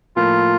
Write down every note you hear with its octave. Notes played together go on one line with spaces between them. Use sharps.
A2 F3 A#3 F4